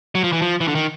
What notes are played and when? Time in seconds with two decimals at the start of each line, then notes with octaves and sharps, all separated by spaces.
0.15 F#3
0.24 F3
0.32 E3
0.42 F3
0.61 E3
0.68 D3
0.75 D#3